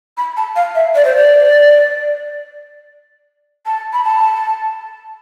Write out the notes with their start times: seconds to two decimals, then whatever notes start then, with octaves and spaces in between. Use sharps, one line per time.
0.17 B5
0.37 A5
0.56 F5
0.75 E5
0.95 D5
1.05 C5
1.16 D5
3.66 A5
3.93 B5
4.04 A5